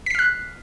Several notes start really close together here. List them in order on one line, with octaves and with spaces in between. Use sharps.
B6 C7 F6 F#6